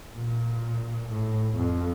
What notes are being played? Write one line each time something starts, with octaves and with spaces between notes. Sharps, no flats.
A#2
A2
F2